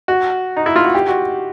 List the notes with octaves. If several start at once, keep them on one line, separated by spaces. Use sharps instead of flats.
F#4
D#4
E4
F4
F#4
G4
F#4